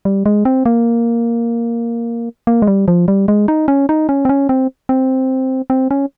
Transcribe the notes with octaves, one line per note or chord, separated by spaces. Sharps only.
G3
G#3
C4
A#3
A#3
G#3
G3
F3
G3
G#3
D#4
C#4
D#4
C#4
C4
C#4
C4
C4
C4
C#4